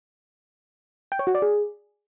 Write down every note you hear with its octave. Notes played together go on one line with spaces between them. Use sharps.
G5
C#5
F#4
D5
G#4